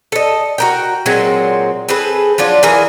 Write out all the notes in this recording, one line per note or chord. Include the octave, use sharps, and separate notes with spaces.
A4 D#5
F#4 A#4 G5
A#2 F#3 G#3 C4
C4 G#4 A4 B4
F3 F#3 D4 F4
E3 G#4 A#4